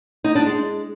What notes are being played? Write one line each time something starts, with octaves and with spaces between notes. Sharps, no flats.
D#4
D4
G#3